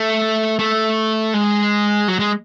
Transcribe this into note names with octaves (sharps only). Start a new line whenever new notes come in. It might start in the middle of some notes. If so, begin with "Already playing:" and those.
Already playing: A3
A3
G#3
F#3
G#3